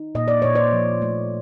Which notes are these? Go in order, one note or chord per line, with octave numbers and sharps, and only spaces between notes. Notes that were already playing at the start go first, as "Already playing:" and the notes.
Already playing: D#4
A#2 D#5
D5
A#2 C#5
C5 D5
F3
A3